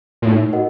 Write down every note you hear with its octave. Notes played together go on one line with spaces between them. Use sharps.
A#2
A2 D#4
F#4 A#4 D#5 F#5